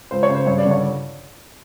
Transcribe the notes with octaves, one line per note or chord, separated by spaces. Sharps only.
C#2 C5
C#5
C#3
C5
G2 C#5
D5
D3
C#5